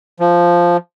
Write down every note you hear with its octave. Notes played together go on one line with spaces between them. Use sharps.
F3